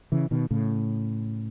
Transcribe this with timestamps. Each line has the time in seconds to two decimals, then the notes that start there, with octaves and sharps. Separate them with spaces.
0.12 C#3 E3
0.31 B2 D#3
0.51 A2 C#3